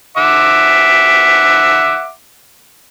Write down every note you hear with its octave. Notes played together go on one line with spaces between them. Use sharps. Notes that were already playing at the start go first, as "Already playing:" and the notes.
E5 F#5 D6